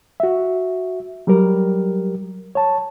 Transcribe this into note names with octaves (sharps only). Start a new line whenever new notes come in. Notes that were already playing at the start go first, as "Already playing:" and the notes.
F#4 E5
F#3 G3 G4 A#4
C#5 A5